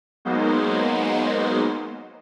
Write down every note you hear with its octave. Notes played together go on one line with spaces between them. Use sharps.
F#3 G#3 A#3 B3 D#4 C5